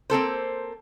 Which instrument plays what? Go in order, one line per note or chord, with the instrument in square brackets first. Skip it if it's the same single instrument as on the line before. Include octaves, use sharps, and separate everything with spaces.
[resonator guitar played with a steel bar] A#3 C4 A4 C5